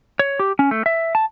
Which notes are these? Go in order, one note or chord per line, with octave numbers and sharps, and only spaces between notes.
C#5
G4
C#4
A3
E5
A5